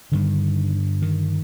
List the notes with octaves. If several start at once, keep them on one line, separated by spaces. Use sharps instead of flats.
G2 D3 D#3
D#3